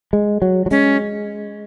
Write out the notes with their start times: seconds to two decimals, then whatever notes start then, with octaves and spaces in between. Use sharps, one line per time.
0.13 G#3
0.42 F#3
0.66 F#3
0.71 G#3 C#4